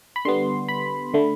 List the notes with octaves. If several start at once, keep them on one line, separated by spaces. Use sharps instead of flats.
B5
D3 G3 B3 C6
B5
D3 A3